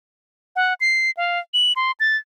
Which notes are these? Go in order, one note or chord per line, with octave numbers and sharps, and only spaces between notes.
F#5
C7
F5
F#7
C6
A6